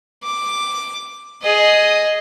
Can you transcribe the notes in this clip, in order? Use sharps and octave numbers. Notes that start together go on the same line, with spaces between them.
D6
G#4 D#5